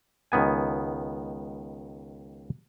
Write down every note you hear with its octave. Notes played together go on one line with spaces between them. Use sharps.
C#2 D#3 B3 G#5